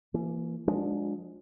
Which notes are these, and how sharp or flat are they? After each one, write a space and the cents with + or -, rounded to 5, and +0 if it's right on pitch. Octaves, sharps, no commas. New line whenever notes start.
E3 +35 A#3 +0
F3 +40 G#3 +0 D4 +0